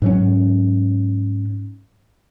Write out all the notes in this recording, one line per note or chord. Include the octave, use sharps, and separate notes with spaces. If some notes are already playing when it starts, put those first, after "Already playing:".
G#2 F#3 C#4